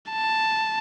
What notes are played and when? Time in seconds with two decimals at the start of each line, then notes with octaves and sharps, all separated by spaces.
0.10 A5